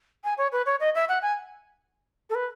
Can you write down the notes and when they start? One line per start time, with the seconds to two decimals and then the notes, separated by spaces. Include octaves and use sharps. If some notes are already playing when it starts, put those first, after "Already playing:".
0.24 G#5
0.38 C#5
0.52 B4
0.66 C#5
0.80 D#5
0.95 E5
1.09 F#5
1.22 G#5
2.30 A4
2.35 B4